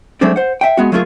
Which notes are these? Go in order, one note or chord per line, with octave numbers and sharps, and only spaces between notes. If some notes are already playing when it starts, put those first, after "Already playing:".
F#3 G#3 A3 C4 D4
C5 F#5
E5 G5
G#3 B3 F#4
F#3 A3 A#3 F4 F#4 G#4